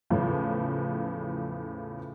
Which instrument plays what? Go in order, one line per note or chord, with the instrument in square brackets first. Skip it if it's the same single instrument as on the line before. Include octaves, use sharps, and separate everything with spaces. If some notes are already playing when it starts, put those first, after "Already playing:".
[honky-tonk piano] E2 A2 C#3 F3